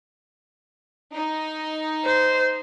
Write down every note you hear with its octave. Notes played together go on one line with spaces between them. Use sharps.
D#4
C5